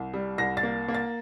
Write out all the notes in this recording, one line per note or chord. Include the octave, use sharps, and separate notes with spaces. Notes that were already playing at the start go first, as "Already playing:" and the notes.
Already playing: C2
G3
C2 A#6
A6
A#3
A#3
A6